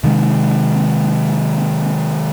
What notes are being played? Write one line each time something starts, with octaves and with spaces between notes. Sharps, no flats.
C3 D#3 G#3